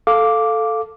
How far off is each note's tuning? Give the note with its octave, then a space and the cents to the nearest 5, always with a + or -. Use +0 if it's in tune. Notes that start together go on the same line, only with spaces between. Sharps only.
A4 +0 F5 +0 D6 -5